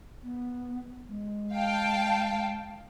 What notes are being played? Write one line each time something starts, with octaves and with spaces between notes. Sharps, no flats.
B3
G#3
F5 G5 A5